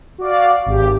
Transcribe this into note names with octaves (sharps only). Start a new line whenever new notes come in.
F#4 D5 F5
G#1 G4